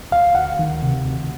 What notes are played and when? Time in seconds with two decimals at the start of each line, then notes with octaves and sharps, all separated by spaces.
0.12 D2 F5
0.35 D2 F#5
0.59 D#3
0.83 C3
1.06 D2